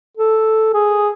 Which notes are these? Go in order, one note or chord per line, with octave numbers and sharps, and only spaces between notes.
A4
G#4